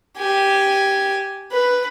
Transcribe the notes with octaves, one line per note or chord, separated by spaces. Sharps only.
G4 G#5
B4